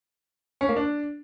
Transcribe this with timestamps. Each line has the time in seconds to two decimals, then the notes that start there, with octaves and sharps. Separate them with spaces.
0.61 C#4
0.69 A#3
0.76 D4